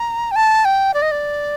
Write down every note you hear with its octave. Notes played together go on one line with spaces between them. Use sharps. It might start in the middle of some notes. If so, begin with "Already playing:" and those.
Already playing: A#5
G5
A5
G5
D5
D#5
D5